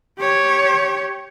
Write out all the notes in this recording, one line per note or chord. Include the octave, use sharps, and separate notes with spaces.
G4 C#5